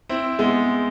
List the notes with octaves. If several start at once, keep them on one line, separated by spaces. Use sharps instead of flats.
C4 E4
G#3 B3